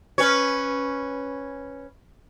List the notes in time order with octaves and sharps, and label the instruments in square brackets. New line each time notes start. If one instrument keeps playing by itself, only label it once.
[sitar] C#4 B4 C#5